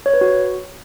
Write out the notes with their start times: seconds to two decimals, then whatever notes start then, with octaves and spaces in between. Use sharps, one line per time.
0.06 C#5
0.14 B4
0.21 F#4